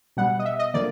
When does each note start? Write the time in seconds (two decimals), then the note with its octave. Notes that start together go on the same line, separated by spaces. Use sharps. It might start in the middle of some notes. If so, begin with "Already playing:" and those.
0.17 B2 G3 B3 F#5
0.39 D#5
0.45 E5
0.59 D#5
0.74 D3 F3 A#3 D5